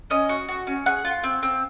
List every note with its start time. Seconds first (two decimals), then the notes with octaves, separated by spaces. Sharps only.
0.10 C#4 D#5
0.29 F#4
0.48 F#4
0.67 C#4
0.86 G#4 F#5
1.05 F4
1.24 C4
1.43 C4